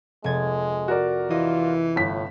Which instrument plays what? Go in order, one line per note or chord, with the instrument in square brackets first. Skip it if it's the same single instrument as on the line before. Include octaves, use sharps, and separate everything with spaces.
[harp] F1 G#6 A6 [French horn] G#3
[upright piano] F#4 A#4 D5
[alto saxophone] E3 [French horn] F4 [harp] D#5
[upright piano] G1 B6 [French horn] A2